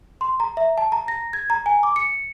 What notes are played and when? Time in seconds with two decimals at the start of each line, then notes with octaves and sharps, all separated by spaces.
0.21 C6
0.40 A#5
0.57 E5
0.78 A5
0.92 A#5
1.08 A#6
1.33 G#6
1.50 A#5
1.66 G#5
1.83 D6
1.96 C#7